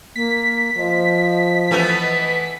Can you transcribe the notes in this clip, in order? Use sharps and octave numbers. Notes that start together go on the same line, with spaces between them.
A#3 B6
F3 D#5
E3 A3 B3